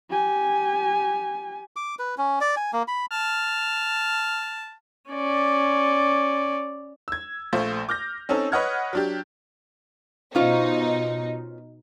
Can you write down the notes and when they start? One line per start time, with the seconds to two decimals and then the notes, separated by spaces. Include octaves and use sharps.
0.10 G4 G#5
1.76 D6
1.99 B4
2.18 C#4
2.41 D5
2.57 G#5
2.73 A#3
2.88 B5
3.12 A5 F6
5.10 C#4 D5
7.08 E6 G#6
7.53 A#1 A3 F4 C5
7.89 D6 F6 G6 A#6
8.29 C4 C#4 D#4 A4
8.52 B4 C#5 D#5 F#5 F6 G#6
8.93 F#3 D4 G4
10.35 B2 C#4 D#4 F4 C5